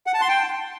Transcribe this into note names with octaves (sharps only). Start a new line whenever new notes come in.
F#5
A5
C6
G5